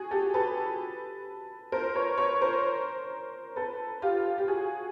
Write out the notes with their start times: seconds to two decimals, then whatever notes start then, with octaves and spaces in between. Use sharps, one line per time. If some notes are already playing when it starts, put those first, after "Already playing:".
Already playing: F#4 G#4
0.11 G4 A4
0.34 A4 B4
1.72 A#4 C5
1.95 B4 C#5
2.18 B4 C#5
2.41 A#4 C5
3.56 A4 B4
4.02 F4 G4
4.38 G4
4.48 F#4 G#4